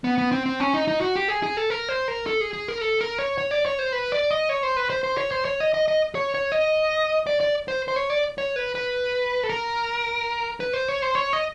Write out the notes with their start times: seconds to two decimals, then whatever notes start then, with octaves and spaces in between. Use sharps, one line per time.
0.04 B3
0.18 B3
0.32 C4
0.46 C4
0.60 C#4
0.74 D#4
0.88 D#4
1.01 F#4
1.16 G4
1.28 G#4
1.43 G#4
1.57 A4
1.70 A#4
1.89 C5
2.08 A#4
2.26 A4
2.41 G#4
2.53 G#4
2.68 A#4
2.81 A4
3.01 A#4
3.19 C#5
3.38 C#5
3.51 D5
3.66 C#5
3.79 C5
3.93 B4
4.12 D5
4.31 D#5
4.49 C#5
4.63 C5
4.76 B4
4.90 C5
5.04 C5
5.18 C#5
5.31 C5
5.45 C#5
5.60 D#5
5.74 D#5
5.88 D#5
6.15 C#5
6.34 C#5
6.52 D#5
7.27 D5
7.40 D5
7.68 C5
7.88 C5
7.96 C#5
8.10 D5
8.38 C#5
8.56 B4
8.75 B4
9.43 A4
9.49 A#4
10.60 B4
10.74 C5
10.88 C#5
11.02 C5
11.15 C#5
11.33 D#5